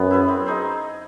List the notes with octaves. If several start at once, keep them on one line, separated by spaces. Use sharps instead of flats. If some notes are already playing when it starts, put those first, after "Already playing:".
Already playing: F#2 B3
E4 G#4 B4
C4
D#4 G#4 C5